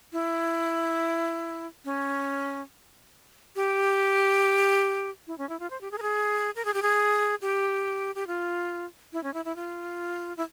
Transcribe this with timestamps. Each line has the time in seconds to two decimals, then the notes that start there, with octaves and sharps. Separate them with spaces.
0.13 E4
1.85 C#4
3.56 G4
5.27 E4
5.38 C#4
5.49 E4
5.60 F4
5.70 C5
5.81 G4
5.91 G#4
5.98 A#4
6.02 G#4
6.56 A#4
6.65 G#4
6.74 G4
6.82 G#4
7.42 G4
8.15 G4
8.27 F4
9.13 E4
9.24 C#4
9.34 E4
9.45 E4
9.56 F4
10.37 E4